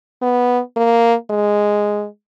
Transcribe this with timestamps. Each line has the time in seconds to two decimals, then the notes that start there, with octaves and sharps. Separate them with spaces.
0.22 B3
0.76 A#3
1.30 G#3